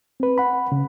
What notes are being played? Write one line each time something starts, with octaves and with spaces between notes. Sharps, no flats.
C4 B4
F#5 B5
C#3